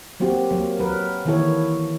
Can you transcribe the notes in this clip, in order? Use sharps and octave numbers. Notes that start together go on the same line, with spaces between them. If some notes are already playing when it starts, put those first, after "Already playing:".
F#3 A#3 C4 F#4 G4
F#3 A#3
F#3 A#4 B4
D#3 E3 A#3 E4 A4 C#5